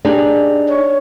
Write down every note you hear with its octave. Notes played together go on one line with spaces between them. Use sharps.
D4 D#4 G4 G#4
C#5